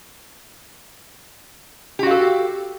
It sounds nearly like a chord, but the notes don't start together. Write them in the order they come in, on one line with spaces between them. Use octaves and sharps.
G4 F#4 F5 A4